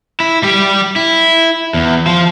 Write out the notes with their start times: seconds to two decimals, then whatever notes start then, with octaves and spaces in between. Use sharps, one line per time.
0.20 E4
0.43 G3 G4
0.96 E4
1.74 E2
2.06 F3